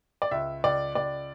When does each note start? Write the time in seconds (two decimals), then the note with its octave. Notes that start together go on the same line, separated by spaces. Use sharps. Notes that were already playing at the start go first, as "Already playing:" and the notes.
0.22 D5
0.31 C#2 E5
0.64 C#2 D5
0.95 C#2 D5